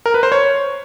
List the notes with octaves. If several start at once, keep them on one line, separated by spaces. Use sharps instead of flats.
A#4
B4
C5
C#5